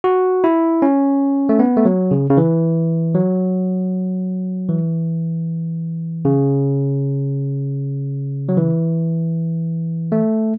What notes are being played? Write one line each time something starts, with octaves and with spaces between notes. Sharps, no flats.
F#4
E4
C#4
A3
B3
A3
F#3
C#3
C#3
E3
F#3
E3
C#3
F#3
E3
A3